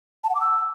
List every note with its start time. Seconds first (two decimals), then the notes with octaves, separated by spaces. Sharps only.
0.24 A5
0.29 F#5
0.35 D6
0.41 E6